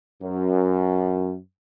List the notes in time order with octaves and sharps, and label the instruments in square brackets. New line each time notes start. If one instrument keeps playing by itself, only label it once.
[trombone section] F#2